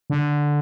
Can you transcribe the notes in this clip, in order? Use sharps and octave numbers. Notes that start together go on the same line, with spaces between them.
D3